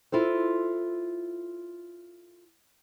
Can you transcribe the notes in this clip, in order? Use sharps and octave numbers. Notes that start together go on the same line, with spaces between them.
E4 F4 A4 C5